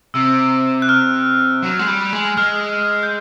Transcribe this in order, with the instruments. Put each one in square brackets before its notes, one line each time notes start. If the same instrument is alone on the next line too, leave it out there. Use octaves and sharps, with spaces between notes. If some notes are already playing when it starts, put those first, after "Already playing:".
[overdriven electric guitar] C3 [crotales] E6
[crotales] F#6
F6
[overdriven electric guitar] F#3
G#3
G3
G#3
[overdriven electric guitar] G#3 [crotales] F6
[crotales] G6